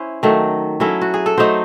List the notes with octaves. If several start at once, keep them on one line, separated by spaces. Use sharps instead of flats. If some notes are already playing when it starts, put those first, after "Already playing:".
Already playing: C#4 E4 C5
D#3 F#3 A3
F#3 C#4 E4 A4
F#4
G#4
A4
F#3 A3 D#4 C5